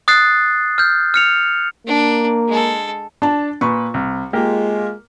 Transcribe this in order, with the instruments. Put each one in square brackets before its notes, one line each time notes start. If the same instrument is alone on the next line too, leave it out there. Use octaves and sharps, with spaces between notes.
[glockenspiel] D#6 F#6 A6 C7
F6 G6
F6 C#7 F7
[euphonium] A#3 [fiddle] D4
[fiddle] G#3 A4
[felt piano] D4 A5
[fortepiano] A#2 B4 [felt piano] C#6
[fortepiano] C2
[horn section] G#3 F4 [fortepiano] A#3 G4 A#4